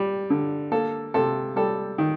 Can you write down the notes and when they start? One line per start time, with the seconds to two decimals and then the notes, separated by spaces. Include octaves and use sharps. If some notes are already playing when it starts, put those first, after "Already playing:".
Already playing: G3
0.30 D3
0.72 A#3 A4
1.14 C3 A4
1.56 G3 A4
1.98 D#3